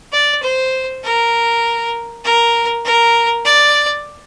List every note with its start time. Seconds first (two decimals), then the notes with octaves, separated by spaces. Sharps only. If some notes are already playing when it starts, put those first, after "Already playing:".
0.12 D5
0.43 C5
1.04 A#4
2.24 A#4
2.85 A#4
3.45 D5